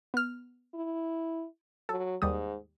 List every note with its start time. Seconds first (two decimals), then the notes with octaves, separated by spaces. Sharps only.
0.14 B3 F6
0.74 E4
1.89 F#3 A4
2.22 D#2 G#2 G3 D#6